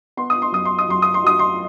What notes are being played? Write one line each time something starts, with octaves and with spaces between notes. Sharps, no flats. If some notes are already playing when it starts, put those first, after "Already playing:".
B3 C6
D#6
C6
F#2 D#6
C6
D#6
F#2 C6
D#6
C6
F#3 D#6
C6